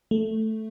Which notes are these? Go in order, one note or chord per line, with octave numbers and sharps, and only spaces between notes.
A3